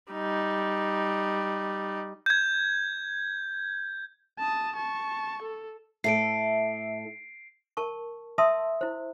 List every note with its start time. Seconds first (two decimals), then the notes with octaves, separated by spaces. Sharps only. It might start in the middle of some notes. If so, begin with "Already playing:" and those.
0.12 G3 D#4
2.26 G6 G#6
4.39 A5 D#6
4.76 A5 C#6
5.43 A4
6.04 A2 A4 E5 C7 D7
7.77 A#4 A5 C#6
8.38 E5 A5 C6 D#6 E6
8.81 E4 C5